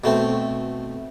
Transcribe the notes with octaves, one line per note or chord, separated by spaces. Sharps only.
B2 A3 C4